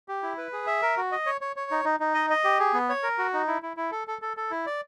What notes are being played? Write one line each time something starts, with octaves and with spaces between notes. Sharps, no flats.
G4
E4
B4
G#4
E5
A#4
F#4
D#5
C#5
C#5
C#5
D#4
D#4
D#4
D#5
D#5
G4
G#4
B3
C#5
A#4
F#4
D#4
E4
E4
E4
A4
A4
A4
A4
E4
D5